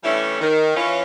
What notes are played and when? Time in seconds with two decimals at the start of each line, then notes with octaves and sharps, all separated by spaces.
0.04 E3 G3 A3 C#4 D4 E4
0.41 D#3
0.76 E3 C#4 F4